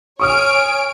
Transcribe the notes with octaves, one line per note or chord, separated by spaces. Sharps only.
C#5 G#5 C#6 D#6 F6 D7